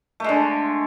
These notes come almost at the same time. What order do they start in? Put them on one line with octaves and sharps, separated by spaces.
A3 G#3 D3